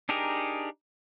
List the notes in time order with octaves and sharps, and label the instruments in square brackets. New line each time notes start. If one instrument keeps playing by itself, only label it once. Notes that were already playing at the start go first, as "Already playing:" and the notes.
[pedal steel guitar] D4 D#4 G4 G#4 A#4